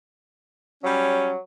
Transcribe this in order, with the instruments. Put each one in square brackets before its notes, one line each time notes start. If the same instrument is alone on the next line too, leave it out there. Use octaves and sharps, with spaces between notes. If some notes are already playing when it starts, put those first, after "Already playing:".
[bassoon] F#3 [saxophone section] G3 C#4